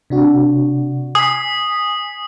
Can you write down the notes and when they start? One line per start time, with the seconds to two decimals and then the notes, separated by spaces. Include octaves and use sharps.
0.10 C3 D4 F#4
1.15 G#5 D#6 B6